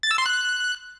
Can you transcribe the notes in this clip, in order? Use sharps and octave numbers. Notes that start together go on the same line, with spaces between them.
A6
E6
C6
F#6